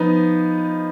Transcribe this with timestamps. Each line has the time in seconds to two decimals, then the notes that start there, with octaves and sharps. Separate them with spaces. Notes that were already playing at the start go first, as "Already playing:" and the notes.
Already playing: F3 B3 D#4